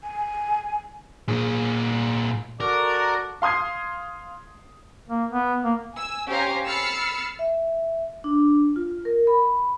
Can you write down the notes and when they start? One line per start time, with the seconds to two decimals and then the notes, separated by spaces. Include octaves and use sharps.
0.04 G#5
1.28 A#2 G#4
2.60 F#4 A4 A#4 D5
3.42 F5 C6 D#6 G#6 C7
5.08 A#3
5.32 B3
5.64 A#3
5.95 G#5 E6
6.28 C#4 G4 C5 F5 G#5 A#5
6.66 B5 E6 F6 A6 C7 C#7
7.39 E5
8.24 D4
8.76 F4
9.05 A#4
9.27 B5